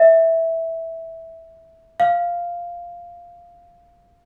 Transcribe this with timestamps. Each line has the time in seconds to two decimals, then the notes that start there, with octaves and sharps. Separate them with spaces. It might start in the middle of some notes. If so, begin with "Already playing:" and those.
Already playing: E5
2.00 F5